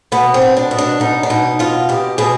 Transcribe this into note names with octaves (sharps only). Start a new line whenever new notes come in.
B2 B3
C4
B2
D4
B2
D4
B2 D#4
D4
B2 D#4
B2 F4
B2 G4
B2 G#4